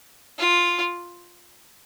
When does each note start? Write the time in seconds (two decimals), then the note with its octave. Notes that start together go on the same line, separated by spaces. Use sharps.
0.38 F4